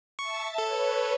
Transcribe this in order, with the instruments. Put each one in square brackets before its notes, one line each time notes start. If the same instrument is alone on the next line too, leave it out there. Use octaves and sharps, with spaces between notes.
[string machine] E5 A5 A6 [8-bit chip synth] C#6
[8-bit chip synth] A4 [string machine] B4 C#5